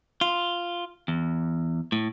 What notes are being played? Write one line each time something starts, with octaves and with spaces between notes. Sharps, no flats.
F4
E2
A2